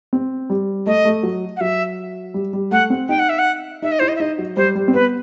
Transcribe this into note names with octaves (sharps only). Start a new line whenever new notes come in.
C4
G3
A3 D#5
A3
F#3
F#5
F#3 E5
G3
G3
A3 F#5
C4
D#4 G5
F#5
E5
F#5
D#4 E5
D#5
E4 C5
D#5
E5
D#4 D#5
F#3
G3 C5
G3
C4
B3 B4